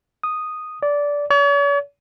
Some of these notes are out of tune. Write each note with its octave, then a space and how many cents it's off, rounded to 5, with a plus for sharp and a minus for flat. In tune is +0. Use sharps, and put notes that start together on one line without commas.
D#6 -5
D5 -15
C#5 +45